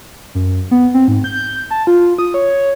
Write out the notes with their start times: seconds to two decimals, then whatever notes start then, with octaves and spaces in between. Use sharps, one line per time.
0.35 F#2
0.71 B3
0.94 C4
1.08 G#2
1.24 G6
1.71 A5
1.87 F4
2.19 D#6
2.34 C#5